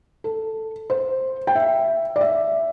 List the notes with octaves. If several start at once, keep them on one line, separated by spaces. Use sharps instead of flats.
A4
C5
G5
E5
D5
E5